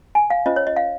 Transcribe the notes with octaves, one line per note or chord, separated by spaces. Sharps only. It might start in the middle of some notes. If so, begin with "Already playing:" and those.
G#5
F5
C#4 F4 C5 D#5
C#5
D#5
F5